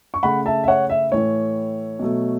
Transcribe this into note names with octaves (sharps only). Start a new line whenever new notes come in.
C#6
C#3 A3 F#5 B5
E5 A5
E5
C#5 F#5
E5
A2 E3 A3 C#5
B2 F#3 A3